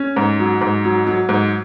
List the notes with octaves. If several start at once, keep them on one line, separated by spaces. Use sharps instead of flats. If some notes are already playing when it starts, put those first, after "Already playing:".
Already playing: C#4
G#2
F#3
G#2
F#3
F#3
G#2